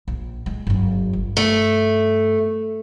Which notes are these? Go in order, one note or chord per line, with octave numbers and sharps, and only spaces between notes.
A#1
G#3
G1 F#2
G2
A3